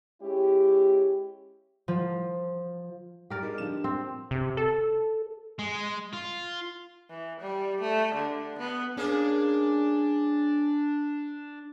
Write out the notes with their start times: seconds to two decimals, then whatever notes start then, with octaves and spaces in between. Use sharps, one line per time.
0.22 G#3 C#4 E4 G4
1.88 F3
3.30 G4 A#4 D5
3.43 G3 G#3
3.58 D3 F3 E7
3.84 C4
4.31 C3
4.57 A4
5.59 G#3
6.13 F4
7.10 E3
7.40 G3
7.81 A3
8.15 D3
8.58 B3
8.97 A#3 C#4 D4 G#4